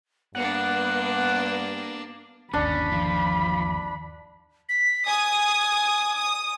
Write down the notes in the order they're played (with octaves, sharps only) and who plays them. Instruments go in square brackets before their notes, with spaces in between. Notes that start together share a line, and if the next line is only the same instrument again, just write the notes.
[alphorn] G2 [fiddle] A#3 D4 [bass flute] B3 [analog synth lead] F#5
[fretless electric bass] G1 D#2 [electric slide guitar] C#4 [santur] D4 [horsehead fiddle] B5
[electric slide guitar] F3
[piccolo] B6
[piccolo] G#5 [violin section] D#6
[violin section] D#6